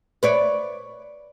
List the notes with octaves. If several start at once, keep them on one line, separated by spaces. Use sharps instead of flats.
B4 C#5 D5